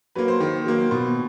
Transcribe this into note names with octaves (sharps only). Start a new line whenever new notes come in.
F#3 A#3 B4
C5
D#3
F#3 A#3
B2